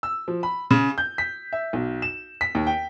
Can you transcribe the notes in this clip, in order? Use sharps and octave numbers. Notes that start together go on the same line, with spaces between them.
E6
F3
B5
C#3
G6
B6
E5
B1
E7
B6
D#2
G5